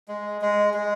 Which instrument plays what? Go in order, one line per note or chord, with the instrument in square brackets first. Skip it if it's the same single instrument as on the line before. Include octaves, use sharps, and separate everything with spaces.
[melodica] G#3
G#3
G#3